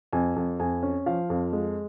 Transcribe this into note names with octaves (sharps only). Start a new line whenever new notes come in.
F2 G#5
F2
F2 G#5
C#4
F3 F5
F2
G#3